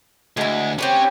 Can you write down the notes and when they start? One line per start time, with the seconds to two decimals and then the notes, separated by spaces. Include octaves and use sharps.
0.37 D2 G#3 E4
0.79 C4 C#4 G4 B4 C#5